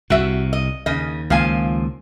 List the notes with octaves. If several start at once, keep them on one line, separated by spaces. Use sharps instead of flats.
C2 C3 F#4 E5
D#5
D#2 C#3 D#5
C#2 D#3 F3 A#3 F5 G#5